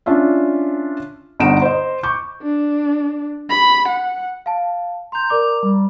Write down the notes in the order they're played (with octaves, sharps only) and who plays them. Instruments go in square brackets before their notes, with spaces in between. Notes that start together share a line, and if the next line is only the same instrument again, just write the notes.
[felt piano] C#4 D4 F4 E5
G1 D3 D#4 D7 E7
C5 D#5
C#6 D6 G6
[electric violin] D4
B5
F#5
[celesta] F5 A5
[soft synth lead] A#5 [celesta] C6 G6
[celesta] A#4 D5 D6
[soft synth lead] G3